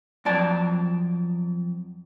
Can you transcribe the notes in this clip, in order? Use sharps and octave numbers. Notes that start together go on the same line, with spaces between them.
F2 F#3 D5 A5